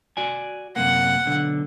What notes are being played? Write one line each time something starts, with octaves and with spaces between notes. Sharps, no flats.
F#4 D5 G#5
F#2 C3 A#3 F#5
B1 D3